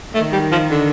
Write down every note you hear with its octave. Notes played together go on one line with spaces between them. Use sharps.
D#3 A3
G3
F3
D3